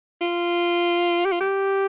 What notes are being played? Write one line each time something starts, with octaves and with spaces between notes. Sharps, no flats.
F4
G4
F4
G4